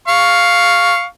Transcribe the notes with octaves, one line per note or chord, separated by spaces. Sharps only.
F5 C#6